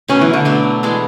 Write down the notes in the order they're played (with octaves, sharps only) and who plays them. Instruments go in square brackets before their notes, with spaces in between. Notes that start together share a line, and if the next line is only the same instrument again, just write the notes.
[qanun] B2 F#3 A3 [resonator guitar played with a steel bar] C#4
[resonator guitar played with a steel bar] E3
D3
[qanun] B2 F#3 A3
E3 G#3 D4